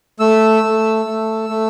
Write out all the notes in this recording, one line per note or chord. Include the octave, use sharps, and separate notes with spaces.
A3 E6
A3
A3
A3